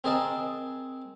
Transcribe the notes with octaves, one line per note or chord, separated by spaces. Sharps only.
C4 G#4 A#4 D#5 A5